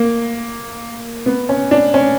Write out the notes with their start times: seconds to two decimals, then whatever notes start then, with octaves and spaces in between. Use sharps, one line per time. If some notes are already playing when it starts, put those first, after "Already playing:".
Already playing: A#3
1.26 B3
1.49 C#4
1.71 D4
1.94 C#4